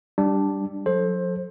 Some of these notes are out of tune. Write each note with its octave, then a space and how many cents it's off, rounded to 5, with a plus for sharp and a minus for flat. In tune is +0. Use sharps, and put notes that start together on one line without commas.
G3 +0 D4 +0
F#3 -45 A4 +0 C5 +20